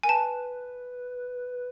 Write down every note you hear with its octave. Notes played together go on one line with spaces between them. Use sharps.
A#4 G#5
B4 A5